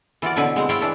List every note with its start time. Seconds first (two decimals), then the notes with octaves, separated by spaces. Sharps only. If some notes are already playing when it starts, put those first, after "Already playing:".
0.22 E3 F4 F#4 D5
0.36 B2 D3 F#3 E4 B4 G#5
0.56 G#3 C4 E4
0.69 C4 E4 C#5 D5 F5 G5
0.81 E3 D4 E4